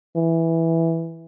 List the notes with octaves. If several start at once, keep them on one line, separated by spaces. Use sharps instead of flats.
E3